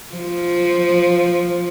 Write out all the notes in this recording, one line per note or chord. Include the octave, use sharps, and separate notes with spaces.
F3